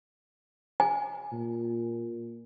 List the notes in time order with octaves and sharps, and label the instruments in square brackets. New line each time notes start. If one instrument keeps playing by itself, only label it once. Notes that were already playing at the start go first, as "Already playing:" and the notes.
[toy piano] G#5
[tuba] A#2